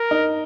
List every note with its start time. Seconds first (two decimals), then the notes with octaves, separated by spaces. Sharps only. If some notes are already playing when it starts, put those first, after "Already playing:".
Already playing: A#4
0.11 D#4